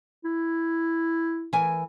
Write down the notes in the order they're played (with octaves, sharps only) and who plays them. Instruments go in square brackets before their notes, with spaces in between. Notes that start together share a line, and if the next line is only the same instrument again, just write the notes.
[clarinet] E4
[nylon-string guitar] E3 A#4 G#5